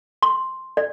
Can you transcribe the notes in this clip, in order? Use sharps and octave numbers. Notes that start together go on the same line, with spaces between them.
C6
D5